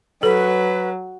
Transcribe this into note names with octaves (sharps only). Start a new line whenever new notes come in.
F#3 A4 B4